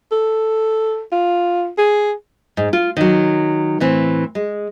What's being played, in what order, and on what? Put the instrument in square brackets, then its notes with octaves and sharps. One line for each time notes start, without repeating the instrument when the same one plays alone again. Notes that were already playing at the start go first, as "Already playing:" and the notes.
[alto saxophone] A4
F4
G#4
[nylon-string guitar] G#2
F4
D#3 F#3
A2 E3 C4
G#3